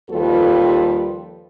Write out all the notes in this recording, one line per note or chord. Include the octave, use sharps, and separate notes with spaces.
D#2 F3 G3 F4 A4 B4